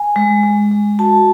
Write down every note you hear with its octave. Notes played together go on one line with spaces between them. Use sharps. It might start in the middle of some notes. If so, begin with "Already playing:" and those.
Already playing: G#5
G#3
G#3
G#3
F#4 A5